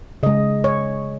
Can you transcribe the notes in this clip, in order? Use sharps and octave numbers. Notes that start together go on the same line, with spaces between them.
C#3 G#3 D#5
C#5